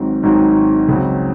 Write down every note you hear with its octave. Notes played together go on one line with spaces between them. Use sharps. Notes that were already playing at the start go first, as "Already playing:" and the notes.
Already playing: G#1 G#2 F#3 C4
G#1 G#2 F#3 C4
C#2 C#3 F#3 C4